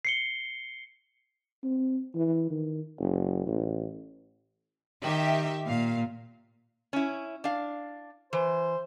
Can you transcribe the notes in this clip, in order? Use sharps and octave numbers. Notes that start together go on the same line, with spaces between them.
C7 C#7 G7
C4
E3
D#3
F#1
A1
D#3 G4 E5
A#2 F5
C#4 E4
D4 F5
E3 C5